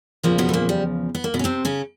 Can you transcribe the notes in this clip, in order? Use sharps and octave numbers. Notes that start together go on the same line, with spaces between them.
E2 A#2 C#3 F3 A#3
B2 B3
A3
A#2 A#3
G3
B3
A#3
B2 B3
C#4
C3 C4
C#3 C#4